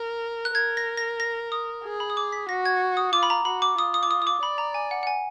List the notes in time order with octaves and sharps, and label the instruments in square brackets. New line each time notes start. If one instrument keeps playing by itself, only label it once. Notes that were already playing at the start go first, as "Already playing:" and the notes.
Already playing: [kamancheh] A#4
[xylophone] F#6
[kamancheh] A#4 [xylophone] G#6
[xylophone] A#6
A#6
A#6
D#6
[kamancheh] G#4
[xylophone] B5
D#6
D6
B6
[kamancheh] F#4 [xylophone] A#6
[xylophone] G#6
D#6
[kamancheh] F4 [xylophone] D6
[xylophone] B5
A#5
[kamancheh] F#4 [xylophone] B5
[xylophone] D6
[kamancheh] F4 [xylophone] D#6
[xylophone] D#6
D6
D#6
D#6
D6
[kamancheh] D5 [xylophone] B5
[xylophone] A#5
G#5
F#5
F#5
G#5